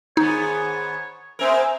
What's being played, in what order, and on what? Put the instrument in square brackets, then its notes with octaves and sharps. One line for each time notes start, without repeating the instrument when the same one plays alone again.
[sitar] G#2 D#3 B3 [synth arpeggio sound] D#4 [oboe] C#5
[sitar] B3 C4 A#4 [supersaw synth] C5 E5 G#5